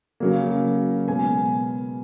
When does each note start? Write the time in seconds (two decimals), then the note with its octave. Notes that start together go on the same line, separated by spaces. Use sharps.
0.20 C#3 F#3 A#3
1.08 B2 G#3 B3 G#5